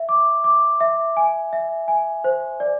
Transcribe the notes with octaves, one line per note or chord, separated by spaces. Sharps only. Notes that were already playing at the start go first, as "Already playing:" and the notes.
Already playing: E5
D6
D6
E5
G#5
E5
G#5
C5
D5